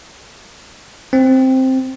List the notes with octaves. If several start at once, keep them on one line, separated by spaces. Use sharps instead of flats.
C4